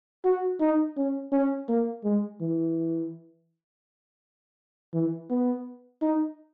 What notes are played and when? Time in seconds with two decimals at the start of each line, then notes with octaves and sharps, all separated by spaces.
0.25 F#4
0.60 D#4
0.97 C#4
1.32 C#4
1.69 A#3
2.04 G#3
2.41 E3
4.94 E3
5.30 B3
6.02 D#4